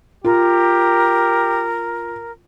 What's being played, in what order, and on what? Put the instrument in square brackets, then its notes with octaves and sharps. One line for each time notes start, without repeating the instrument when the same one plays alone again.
[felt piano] F4 [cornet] G4 [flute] A#4